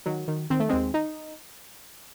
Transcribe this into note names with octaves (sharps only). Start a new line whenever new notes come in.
D#3 F#3
D#3
D#3 C4
A3
D#2 G#3 C4
D#4